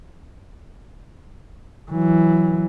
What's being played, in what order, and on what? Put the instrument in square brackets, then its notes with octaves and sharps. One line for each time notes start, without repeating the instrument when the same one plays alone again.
[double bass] E3 F#3